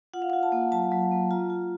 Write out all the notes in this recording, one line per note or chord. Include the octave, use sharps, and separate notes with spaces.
F4 F#5
F5
F4 F#5
A5
A#3
F#3 A5
F#3
A#3
F4 A#5
F4